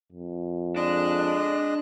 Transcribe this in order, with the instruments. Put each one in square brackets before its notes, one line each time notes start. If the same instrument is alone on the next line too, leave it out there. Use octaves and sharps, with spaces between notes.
[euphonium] F2
[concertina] G#3 D#5 F#6 [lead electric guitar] D4